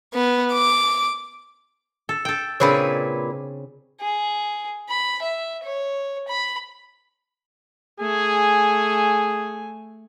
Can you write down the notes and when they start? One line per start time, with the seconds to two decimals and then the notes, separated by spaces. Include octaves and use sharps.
0.14 B3
0.53 D6
2.09 A4
2.25 A4 G5
2.60 A#2 C#3 C4 D4 B4 C#5
4.00 G#4
4.89 B5
5.22 E5
5.64 C#5
6.28 B5
8.00 A3 G#4 G#5